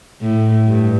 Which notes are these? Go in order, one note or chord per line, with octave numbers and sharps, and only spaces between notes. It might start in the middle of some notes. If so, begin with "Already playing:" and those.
A2
G2